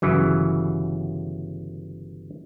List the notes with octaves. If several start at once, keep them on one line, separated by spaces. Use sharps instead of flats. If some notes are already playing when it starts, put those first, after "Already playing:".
G1 C#3 E3 F#3